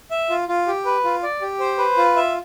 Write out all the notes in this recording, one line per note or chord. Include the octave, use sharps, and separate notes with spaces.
E5
F4
F4
G4
B4
F4
D5
G4
C5
B4
F4
E5